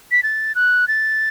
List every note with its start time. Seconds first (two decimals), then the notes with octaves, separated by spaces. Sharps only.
0.12 B6
0.23 A6
0.55 F#6
0.88 A6